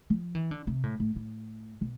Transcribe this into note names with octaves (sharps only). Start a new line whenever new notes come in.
F3
E3
D3
C3
A2
A2
A2
B2